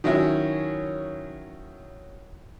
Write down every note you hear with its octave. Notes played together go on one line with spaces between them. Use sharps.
D#3 F#3 C#4 E4